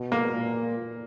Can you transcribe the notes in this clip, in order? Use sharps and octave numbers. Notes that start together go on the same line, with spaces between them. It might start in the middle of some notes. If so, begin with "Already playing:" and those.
Already playing: B2
A#3
A#2